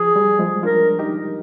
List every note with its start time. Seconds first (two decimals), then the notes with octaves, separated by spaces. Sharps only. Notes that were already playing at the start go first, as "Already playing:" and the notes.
Already playing: F3 G#4
0.16 G3
0.39 F3 G#3
0.63 D4 F4 A#4
0.99 D#4 G4